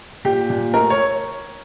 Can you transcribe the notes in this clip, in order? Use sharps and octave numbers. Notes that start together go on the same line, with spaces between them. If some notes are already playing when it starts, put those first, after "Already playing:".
A#2 G4
A#2
A3 A#4
C#5